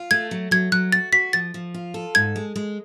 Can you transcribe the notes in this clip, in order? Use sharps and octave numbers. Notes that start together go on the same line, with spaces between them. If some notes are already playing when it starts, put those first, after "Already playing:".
Already playing: F4
A3 G#6
F#3
F#3 G#6
F#3 F#6
F#4 A6
F#4 B6
F3 A6
F3
F4
A4
G#2 G#6
G#3
G#3